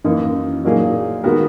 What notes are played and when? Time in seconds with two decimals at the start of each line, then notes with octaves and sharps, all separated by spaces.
0.04 F#2 E3 A#3 D#4
0.64 A#2 F#3 A#3 D#4 G#4
1.24 D#3 G#3 B3 F#4 A#4